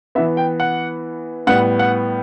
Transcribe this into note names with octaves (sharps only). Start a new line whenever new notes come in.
E3 B3 E5
G5
F#5
A2 G3 B3 F#5
F#5